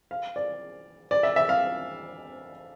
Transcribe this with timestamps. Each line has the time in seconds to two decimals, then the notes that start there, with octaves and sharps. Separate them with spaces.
0.11 F5
0.36 D5
1.11 D5
1.23 E5
1.36 E5
1.49 F5